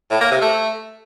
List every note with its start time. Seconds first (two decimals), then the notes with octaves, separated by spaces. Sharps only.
0.11 A2
0.21 A#3
0.31 C3
0.41 A3